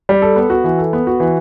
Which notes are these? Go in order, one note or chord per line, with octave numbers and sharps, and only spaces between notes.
G3
A4
B3
F#4
E3
A4
B3
F#4
E3